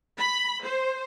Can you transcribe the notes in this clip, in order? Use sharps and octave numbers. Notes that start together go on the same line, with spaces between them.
B5
C5